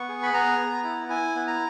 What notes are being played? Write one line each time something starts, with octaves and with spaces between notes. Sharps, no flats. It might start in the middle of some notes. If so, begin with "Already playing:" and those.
Already playing: B3 C#6
G#4
B5
B3 A#5
B3
E4
E4 G#5
B3
A#5